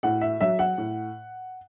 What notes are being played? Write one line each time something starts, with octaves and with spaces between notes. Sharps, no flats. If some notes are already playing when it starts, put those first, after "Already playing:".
A2 F#5
E5
F#3 E5
F#5
A2